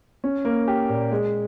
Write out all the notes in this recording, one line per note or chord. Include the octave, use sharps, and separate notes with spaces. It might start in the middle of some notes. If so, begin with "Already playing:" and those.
C#4
A#3
G4
A#2
G#3